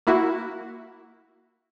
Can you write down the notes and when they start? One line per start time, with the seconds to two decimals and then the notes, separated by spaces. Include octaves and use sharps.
0.07 A#3 E4 F#4